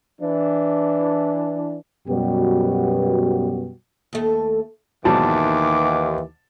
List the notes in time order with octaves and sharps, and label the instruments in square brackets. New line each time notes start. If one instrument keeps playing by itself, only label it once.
[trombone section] E3 D4
F#2 B2 G3 B3 F#4 G4
[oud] D#2 A3
[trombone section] D#2 E3 [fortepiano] G#2 B2 F#3 [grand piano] A5 [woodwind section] D6